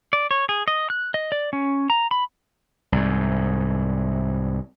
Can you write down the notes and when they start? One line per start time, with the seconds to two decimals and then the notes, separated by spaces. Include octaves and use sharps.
0.13 D5
0.31 C#5
0.49 G#4
0.68 D#5
0.90 F#6
1.14 D#5
1.32 D5
1.53 C#4
1.90 A#5
2.11 B5
2.92 C2 G#2